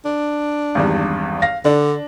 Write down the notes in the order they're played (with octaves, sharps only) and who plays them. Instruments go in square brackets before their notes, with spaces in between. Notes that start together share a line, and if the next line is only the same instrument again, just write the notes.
[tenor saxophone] D4
[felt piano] G#1 E2 G2
F5 A#6
[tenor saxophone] D3 [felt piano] D4